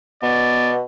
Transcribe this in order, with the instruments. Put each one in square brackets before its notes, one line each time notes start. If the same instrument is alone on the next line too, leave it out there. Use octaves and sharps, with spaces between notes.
[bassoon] B2 [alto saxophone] B3 [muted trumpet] D5